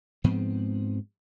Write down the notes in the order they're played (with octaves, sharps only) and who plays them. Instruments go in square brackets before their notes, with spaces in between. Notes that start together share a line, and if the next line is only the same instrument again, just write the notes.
[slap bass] G#2 F3 B3 C4